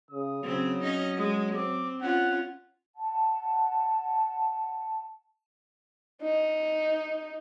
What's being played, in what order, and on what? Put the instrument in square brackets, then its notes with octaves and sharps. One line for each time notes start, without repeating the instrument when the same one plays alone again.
[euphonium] C#3 [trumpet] D#6
[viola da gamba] C#3 C4 [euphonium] F#3
[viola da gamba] C#4 D#4 D#5
G#3
[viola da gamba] C4 [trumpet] D6
[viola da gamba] C#4 F4 [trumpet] F#5
[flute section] F#5 A5
[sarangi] D#4